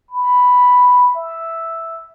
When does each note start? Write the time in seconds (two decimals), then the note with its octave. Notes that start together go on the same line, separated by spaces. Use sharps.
0.11 B5
1.15 E5